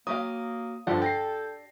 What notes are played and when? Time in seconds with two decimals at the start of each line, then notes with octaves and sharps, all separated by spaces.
0.07 F#3 A#3 G4 F5 D#6
0.87 G2 D3 F3 D4 G4 A4 F#5
1.02 G5 A#6 C7